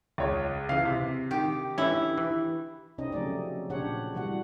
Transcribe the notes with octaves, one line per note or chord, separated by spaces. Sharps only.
C#2 C#5
C#3 E3 F5
C3
D#3 G4
E3 C#4 E4
E3
C3 C4 C#4 D#4 D#5
C#3 F3 F#3 A3 D#4 D5
A#2 C#3 D4 G4 C#5 F#5
C3 E3 G3 F#4 F#5